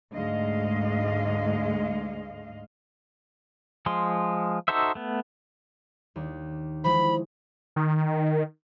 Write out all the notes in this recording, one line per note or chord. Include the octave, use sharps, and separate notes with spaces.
D2 G#2 G#3 D#5 F5
F3 G#3 C6
D#4 F#4 A4 C5 E5
A3 B3
D#2 D4
E3 F3 G#3 C5 B5
D#3